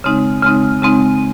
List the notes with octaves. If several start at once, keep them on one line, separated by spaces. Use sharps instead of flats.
C#3 G#3 C4 D#4
C#3 G#3 C4 D#4
C#3 G#3 C4 D#4